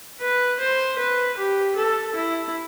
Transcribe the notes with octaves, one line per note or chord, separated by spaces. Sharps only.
B4
C5
B4
G4
A4
E4